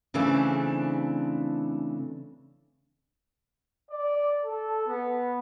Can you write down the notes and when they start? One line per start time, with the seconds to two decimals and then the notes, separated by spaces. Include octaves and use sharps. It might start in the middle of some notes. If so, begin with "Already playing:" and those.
0.14 C#3 E3 A3 C4 D4
3.91 D5
4.44 A4
4.87 B3